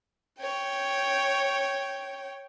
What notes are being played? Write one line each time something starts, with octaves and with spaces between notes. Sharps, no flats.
C#5 G5